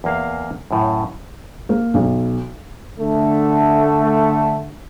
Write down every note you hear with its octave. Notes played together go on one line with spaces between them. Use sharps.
E2 A#3 F5
F#2 A2
A#3
B1
D3 A3